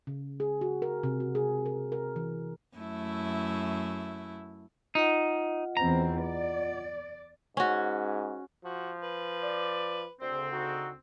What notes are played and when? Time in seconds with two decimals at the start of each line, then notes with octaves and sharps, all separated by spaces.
0.07 C#3
0.40 G#4
0.61 F#4
0.82 A#4
1.03 C3
1.20 F#4
1.35 G#4
1.66 A#4
1.92 A#4
2.16 E3
2.77 F#2 A3 E4
4.95 D#4 F4 D#5 F#5
5.77 E2 C4 A#5
6.22 D5
7.57 G#2 C#4 F#4
8.65 F3 F#4
9.03 B4
9.42 D5
10.21 D2 C#3 C4 C5
10.52 D#4 F#4